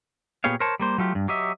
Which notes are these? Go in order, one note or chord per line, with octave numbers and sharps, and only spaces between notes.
A#2 B3 G4 G#4 C#5 F5
A#4 C5 C#5 A5
G3 A#3 C5
F#3 A3 F4 G4
G2
F#3 G4 D#5 E5